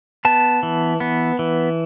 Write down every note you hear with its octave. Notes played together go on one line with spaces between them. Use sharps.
B3 A5
E3
B3
E3